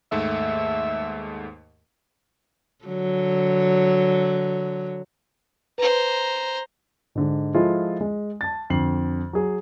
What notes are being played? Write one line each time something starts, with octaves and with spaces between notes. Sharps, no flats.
D#2 G#2 A3 E5
D3 F#3
B4 C5 A#5
G#2 D3 G#3
F3 G#3 E4 F4 A4
G#3
A5 A6
F2 D3 C7 F#7
F#3 G#4